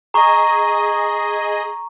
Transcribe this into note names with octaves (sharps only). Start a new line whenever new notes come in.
G#4 D#5 A#5 C#6